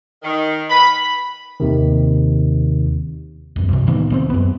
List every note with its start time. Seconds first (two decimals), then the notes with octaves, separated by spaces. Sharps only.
0.23 D#3
0.70 B5
1.60 D#2 C3 D#3
3.56 C2 F#2
3.69 G2 C3
3.87 A2 D#3 A#3 B3
4.10 C2 G#3 C4
4.30 F#2 B3